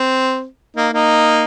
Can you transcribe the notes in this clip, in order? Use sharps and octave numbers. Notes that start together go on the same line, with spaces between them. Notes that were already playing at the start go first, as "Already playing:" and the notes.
Already playing: C4
A#3 D#4
A#3 D#4